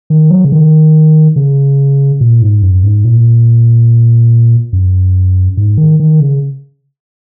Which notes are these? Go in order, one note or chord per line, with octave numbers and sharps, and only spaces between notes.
D#3
F#3
C#3
D#3
C#3
A#2
G#2
F#2
G#2
A#2
F#2
G#2
D#3
D#3
C#3